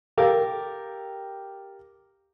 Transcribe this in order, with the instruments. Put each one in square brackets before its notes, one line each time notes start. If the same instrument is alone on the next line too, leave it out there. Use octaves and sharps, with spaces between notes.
[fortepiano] G4 A4 A#4 F5